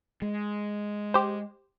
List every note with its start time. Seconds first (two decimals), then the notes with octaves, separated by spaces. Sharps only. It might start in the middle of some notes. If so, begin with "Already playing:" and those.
0.22 G#3
1.14 G4 C5